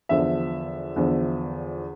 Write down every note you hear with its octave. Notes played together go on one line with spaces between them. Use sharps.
E2 D3 F3 E5
E2 D3 F3